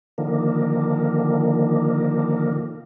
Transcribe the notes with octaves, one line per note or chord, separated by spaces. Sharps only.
D3 D#3 F3 A#3